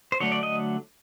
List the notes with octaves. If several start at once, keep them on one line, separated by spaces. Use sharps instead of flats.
C5
D3 F#3 A3 D4 C#5
D5
D#5